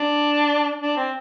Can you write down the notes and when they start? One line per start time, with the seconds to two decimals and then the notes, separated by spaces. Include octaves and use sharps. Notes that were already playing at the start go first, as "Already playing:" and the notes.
Already playing: D4
0.81 D4
0.96 C4